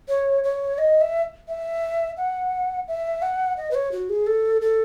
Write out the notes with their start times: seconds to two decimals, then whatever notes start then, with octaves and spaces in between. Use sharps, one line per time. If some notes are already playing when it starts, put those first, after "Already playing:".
0.08 C#5
0.44 C#5
0.78 D#5
1.01 E5
1.48 E5
2.17 F#5
2.88 E5
3.22 F#5
3.57 D#5
3.71 B4
3.75 C#5
3.92 F#4
4.09 G#4
4.27 A4
4.61 A4